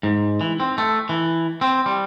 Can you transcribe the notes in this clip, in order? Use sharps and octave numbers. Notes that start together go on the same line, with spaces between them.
G#2
E3
C4
A3
E3
C4
G3